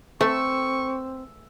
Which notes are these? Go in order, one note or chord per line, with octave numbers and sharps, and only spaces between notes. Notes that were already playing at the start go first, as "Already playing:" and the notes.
A3 C4 C#6 E6